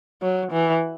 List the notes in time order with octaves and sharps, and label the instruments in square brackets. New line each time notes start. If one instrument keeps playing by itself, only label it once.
[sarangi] F#3
E3